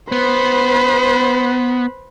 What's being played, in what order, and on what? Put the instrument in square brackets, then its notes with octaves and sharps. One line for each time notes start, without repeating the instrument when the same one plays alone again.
[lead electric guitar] B3 [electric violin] B4 C5